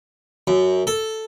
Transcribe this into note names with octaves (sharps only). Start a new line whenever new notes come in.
F#2
A4